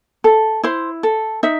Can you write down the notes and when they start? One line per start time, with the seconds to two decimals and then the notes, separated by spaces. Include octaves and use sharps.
0.24 A4
0.63 E4 C5
1.03 A4
1.43 D#4 E5